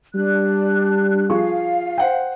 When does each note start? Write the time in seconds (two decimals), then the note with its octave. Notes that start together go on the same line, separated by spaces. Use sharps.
0.15 G3 D4 F#6
1.30 F3 G#4 F5 C#6
1.98 C5 F#5 G5